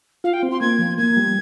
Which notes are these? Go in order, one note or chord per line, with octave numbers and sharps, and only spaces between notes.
F4 F5
G5
C4
C6
A#3 G#6
F3
A#3 G#6
G3